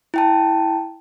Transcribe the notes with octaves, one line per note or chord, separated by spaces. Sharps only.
E4 G5 A5